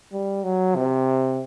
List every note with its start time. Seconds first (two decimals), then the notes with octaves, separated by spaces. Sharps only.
0.13 G3
0.44 F#3
0.76 C3